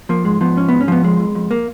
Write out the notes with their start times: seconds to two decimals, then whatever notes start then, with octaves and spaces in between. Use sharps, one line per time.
0.09 F3 A#3
0.25 G#2 G#3
0.41 F3 B3
0.56 G#2 C#4
0.69 G#2 B3
0.81 C#4
0.88 F3 B3
1.03 F2 G#3
1.20 F2
1.35 F2
1.51 A#3